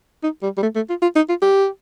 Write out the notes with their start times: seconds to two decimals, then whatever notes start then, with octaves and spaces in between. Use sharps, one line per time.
0.23 D#4
0.43 G3
0.58 G3
0.63 A3
0.76 A3
0.89 F4
1.02 F4
1.15 D#4
1.29 F4
1.42 G4